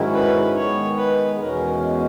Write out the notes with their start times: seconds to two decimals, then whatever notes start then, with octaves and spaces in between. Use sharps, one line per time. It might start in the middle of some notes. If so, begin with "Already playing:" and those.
Already playing: G#2 D#3 F#3 C#4 E4
0.14 B4
0.56 D#3 G#3 B3 C#5
0.97 B4
1.39 E2 B2 G#3 C#4 A#4